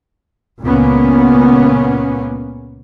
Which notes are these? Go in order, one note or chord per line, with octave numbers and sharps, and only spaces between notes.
C#2 A#2 A#3 B3 C#4